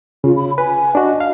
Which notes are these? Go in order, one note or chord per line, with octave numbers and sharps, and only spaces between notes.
C#3 F4
B5
B4 G#5
D4 F#4 D#5
F5